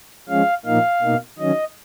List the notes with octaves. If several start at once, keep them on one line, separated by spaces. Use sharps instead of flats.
F3 G#3 C#4 F5
A#2 F3 A#3 D#4 F5
B2 A#3 D#4
D#3 F#3 C#4 D#5